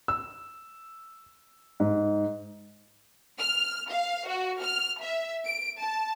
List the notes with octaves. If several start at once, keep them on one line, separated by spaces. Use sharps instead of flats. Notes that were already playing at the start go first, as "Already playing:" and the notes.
E6
G#2
F6
F5
F#4
F6
E5
D7
A5